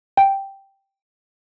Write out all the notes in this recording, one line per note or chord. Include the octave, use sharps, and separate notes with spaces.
G5